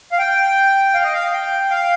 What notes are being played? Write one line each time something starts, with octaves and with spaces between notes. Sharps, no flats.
F5
G5
F5
D#5
F5
G5
F5